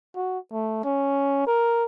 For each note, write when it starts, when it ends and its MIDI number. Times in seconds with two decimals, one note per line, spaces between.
0.16 0.39 66
0.52 0.82 57
0.84 1.46 61
1.47 1.85 70